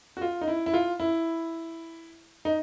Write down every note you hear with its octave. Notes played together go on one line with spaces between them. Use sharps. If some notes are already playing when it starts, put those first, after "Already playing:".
F#4
F4
D#4
E4
E4
F4
E4
D#4